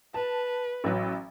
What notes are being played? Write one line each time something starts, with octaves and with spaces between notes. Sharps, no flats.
B4 A5
A1 F#3